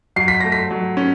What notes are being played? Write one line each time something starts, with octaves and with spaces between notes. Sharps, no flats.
F#3 C7
B6
A3 A#6
B6
F#3
C#4